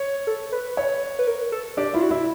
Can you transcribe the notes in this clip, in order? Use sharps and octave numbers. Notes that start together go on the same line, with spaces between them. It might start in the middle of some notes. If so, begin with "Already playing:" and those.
Already playing: C#5
A4
B4
C#5
B4
A#4
A4
D4 G4 D5
E4 F4 E5
F#4
E4 E5